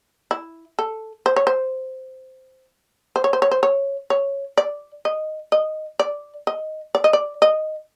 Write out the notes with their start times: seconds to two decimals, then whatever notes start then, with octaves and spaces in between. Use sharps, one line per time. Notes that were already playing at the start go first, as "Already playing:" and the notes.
0.31 E4
0.79 A4
1.26 C5
1.36 C#5
1.47 C5
3.16 C5
3.24 C#5
3.33 C5
3.42 C#5
3.51 C5
3.63 C#5
4.10 C#5
4.57 D5
5.05 D#5
5.52 D#5
5.99 D5
6.47 D#5
6.95 D5
7.04 D#5
7.13 D5
7.42 D#5